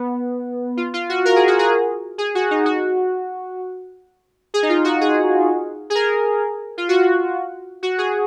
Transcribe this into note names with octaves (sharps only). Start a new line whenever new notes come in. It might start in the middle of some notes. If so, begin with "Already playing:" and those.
Already playing: B3
F4
F4
F#4
A#4
G#4
F#4
G#4
G#4
F#4
D#4
F#4
G#4
D#4
F4
F#4
G#4
G#4
A#4
F4
F#4
F#4
G#4